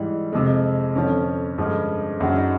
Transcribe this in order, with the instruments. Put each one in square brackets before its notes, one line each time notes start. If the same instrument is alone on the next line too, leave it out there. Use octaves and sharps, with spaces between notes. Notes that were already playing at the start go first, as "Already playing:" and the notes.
Already playing: [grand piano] G#2 E3 G3
F2 C3 F3 G#3
F2 D3 F3 C#4
G2 D3 F3 G#3
F#2 C#3 F#3 D4
D#4